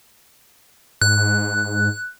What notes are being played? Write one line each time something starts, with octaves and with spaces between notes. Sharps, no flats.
G#2 F#6